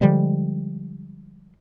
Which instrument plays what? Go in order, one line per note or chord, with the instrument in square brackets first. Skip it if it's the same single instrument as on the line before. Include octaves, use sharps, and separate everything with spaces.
[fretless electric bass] D3 F3 G3 G#3